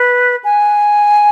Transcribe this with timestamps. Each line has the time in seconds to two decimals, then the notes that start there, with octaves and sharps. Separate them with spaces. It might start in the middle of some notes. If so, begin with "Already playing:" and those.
Already playing: B4
0.44 G#5